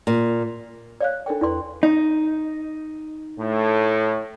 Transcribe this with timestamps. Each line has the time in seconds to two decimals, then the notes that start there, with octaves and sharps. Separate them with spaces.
0.07 A#2
1.01 C#5 D5 F5 F#6
1.26 D4 A4 A#4 D5 G5
1.41 E2 E4 B4 D5 C6
1.83 D#4
3.39 A2